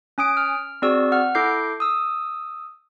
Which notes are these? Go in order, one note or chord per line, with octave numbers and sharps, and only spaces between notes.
C#4 G#5 D#6 D7
F6
C4 F#4 G#4 D5 E6
F#5 F6
E4 A4 D6 G6 C7
D#6 E6